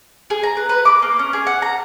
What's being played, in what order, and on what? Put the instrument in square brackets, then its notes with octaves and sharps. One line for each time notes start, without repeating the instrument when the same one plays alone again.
[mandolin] G#4
A#5
B4
B4
D6
A#3
C#4
G#4
F#5
A#5